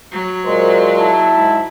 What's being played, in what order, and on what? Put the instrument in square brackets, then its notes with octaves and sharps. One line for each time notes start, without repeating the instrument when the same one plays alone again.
[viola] F#3
[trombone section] A#2 G#3 A#4 [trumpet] C5
[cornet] E4 [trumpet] A5
[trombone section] G#2